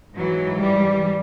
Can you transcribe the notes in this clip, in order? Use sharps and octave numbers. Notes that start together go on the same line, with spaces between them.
G#2 E3 F#3
G3